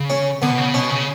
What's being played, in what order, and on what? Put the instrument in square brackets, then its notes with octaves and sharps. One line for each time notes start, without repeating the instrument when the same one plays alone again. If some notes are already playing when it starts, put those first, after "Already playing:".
Already playing: [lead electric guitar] C#3
[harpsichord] C#4
[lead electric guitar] D3 [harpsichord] B3
[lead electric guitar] B2
C#3
[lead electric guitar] B2 [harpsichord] C#4
[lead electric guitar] C#3